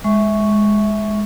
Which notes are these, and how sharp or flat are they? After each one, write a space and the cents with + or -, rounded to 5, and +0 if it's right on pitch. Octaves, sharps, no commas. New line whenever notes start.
G#3 +0 E5 -15 C#6 +0